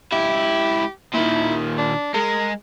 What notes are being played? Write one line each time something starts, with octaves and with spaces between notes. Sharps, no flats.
C#2 E4 G4
A#2 D#3 E4
D4
G#3 A#4